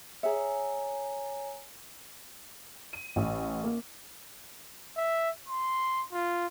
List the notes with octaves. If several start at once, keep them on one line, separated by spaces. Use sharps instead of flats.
G#4 C#5 E5 G#5 A#5
D#7
A1
A#3
E5
C6
F4